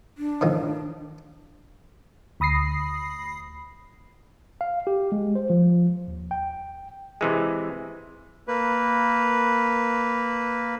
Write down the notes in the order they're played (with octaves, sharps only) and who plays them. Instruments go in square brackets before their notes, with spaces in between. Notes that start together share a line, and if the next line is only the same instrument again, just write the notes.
[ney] D4
[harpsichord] A2 D#3 F3
[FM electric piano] D2 B5 D#6 A#6 C7
[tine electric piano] F5
G4
G#3
C5
F3
D#2
G5
[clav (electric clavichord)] C3 E3 G#3
[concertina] A#3 B4